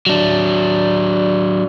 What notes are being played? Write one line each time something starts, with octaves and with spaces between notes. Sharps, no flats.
F#3 D4